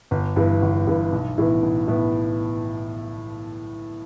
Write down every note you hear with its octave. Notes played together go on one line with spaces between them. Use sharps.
G1
G2 E3 B3
G1
G2 E3 B3
B1
A2 E3 B3
B1
A2 E3 B3